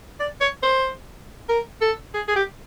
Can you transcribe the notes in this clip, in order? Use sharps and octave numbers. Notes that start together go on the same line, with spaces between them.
D5
C#5
C5
A#4
A4
G#4
G#4
G4